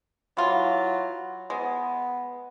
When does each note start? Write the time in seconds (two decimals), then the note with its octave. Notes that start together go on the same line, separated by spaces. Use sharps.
0.37 E3 F#3 F4
1.50 G#3 B3